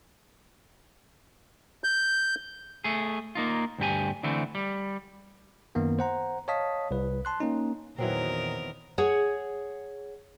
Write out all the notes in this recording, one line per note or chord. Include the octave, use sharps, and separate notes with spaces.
G6
A3 G#4
A#3 D#4 F4
D2 G2 G4 G#5
D3 E3 A3 C4
G3
F#2 D#3 A#3 B3
C5 F#5 A#5
C#5 D#5 F5 A5 D#6 B6
C2 B4
A5 C6 F#6
A#3 C#4 D#4
E2 A#2 D#3 E3 F#3 C4 A#4
G#4 C#5 F#5